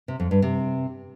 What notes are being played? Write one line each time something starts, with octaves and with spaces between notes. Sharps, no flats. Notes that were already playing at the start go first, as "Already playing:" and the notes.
C3
F2
G2
C3